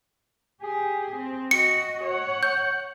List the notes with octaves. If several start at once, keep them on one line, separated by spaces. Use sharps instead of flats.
G4 G#4
C4
F#4 D#5 C#7
C#5 F#5
G6